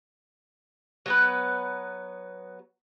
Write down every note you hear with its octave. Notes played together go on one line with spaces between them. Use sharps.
F#3 B3 B4